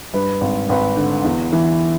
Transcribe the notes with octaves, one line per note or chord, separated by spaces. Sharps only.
G2 B4
G#1
G#1 B4
D3
E2
E3